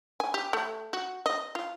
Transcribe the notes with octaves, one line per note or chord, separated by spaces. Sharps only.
G#5
G4
A3
F#4
D#5
F4